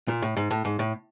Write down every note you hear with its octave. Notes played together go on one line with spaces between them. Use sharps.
A#2
A2
G#2
A2
G#2
A2